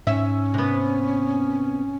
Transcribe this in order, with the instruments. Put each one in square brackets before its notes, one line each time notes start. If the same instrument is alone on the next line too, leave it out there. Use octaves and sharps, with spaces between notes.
[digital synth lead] G#2 [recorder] C#4 [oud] E5
[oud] C3 B3